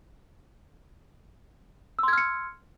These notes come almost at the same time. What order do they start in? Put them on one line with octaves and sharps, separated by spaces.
E6 C6 G#6 F6 C#7